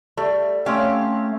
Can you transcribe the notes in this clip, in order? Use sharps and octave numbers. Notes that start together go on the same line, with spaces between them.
G3 A3
A3 C4 C#4 G4 F5